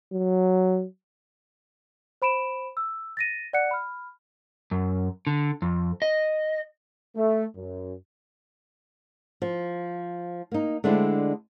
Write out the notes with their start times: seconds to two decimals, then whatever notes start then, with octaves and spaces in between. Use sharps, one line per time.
0.12 F#3
2.22 C5 B5 D7 E7
2.77 E6
3.17 A6 A#6 D#7
3.53 D5 F#5 F#6 C#7
3.71 B5 F6
4.71 F#2
5.27 D3
5.62 F2
6.02 D#5
7.16 A3
7.56 F#2
9.42 F3
10.52 A#3 D#4
10.84 D3 G#3 A3 C4 D4 E4